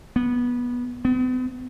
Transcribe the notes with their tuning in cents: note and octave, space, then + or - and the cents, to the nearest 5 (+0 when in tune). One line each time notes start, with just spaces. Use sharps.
B3 -20
B3 +45